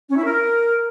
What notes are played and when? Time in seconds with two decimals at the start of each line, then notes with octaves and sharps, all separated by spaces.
0.09 C#4
0.16 E4
0.24 A#4